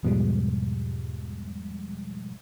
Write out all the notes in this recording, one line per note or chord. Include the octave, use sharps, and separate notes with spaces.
E2 G#2 B2 F3 G3 G#3